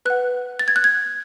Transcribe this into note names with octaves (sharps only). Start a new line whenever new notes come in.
B4 F#5 F#6
A6
G#6
F#6
G#6